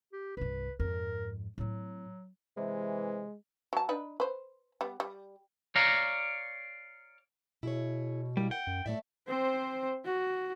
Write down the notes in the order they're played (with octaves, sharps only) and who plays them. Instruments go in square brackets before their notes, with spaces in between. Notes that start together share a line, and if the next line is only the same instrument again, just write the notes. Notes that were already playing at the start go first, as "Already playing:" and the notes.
[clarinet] G4
[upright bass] C2 G2 [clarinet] B4
[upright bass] F2 G#2 [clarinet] A#4
[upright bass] A2 C4 [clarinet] F#3
[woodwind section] C3 E3 [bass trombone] G#3
[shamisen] F#3 A5
D4 D#4 B4
B4 C5
G3 B3
G3
[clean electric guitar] C#5 D5 F5 A#5
[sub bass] B2 [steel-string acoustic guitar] E4 G#4 C#5
[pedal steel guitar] G3 [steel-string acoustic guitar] A#3 E4 A#4
[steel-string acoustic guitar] F#5 [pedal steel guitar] G5
[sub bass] F#2
[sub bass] A2 [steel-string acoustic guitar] A3 D5 E5
[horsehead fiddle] C4 C5
F#4